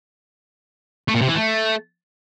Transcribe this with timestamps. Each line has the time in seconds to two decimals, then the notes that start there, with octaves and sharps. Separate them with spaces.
1.08 A3
1.15 A#2
1.22 C3
1.28 E3
1.35 A3